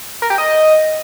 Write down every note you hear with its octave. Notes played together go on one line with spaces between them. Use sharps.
A#4
G4
D#5